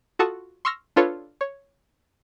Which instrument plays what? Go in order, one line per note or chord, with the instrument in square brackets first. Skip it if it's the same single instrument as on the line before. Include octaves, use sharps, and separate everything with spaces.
[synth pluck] F4 F#4 A4 A5 C#6 D#6
C6 C#6 E6 F6 A#6
D4 F4 A4 B4 C#5
C#5